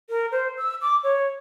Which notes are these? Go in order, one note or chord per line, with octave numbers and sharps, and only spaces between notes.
A#4
C5
E6
D6
C#5